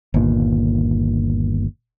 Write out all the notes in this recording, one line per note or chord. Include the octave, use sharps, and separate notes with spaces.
G1 D#2 A#2